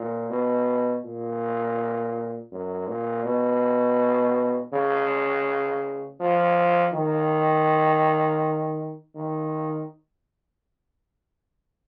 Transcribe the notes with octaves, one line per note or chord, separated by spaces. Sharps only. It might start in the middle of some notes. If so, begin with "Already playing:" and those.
Already playing: A#2
B2
A#2
F#2
A#2
B2
C#3
F3
D#3
D#3